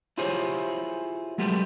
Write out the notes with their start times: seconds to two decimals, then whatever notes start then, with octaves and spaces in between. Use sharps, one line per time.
0.18 E4 F4 G4 G#4 C5 C#5
1.38 F#3 G#3 A3 B3 G4